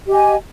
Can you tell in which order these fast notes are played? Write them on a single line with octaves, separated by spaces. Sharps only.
G4 D#5 G#5